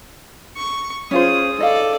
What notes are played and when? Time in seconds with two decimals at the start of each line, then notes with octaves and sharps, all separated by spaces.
0.56 C#6
1.11 C#4 F4 G#4 C5 D#6
1.58 D#4 A4 D5 D#5 F5